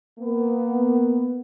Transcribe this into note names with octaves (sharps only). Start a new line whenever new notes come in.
A#3 B3